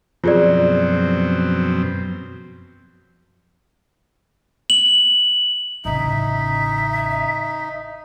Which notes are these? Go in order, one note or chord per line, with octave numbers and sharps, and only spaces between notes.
F#2 B2 F3 C4 F4 G#4 D5
F#7
A1 C#3 D#4 E5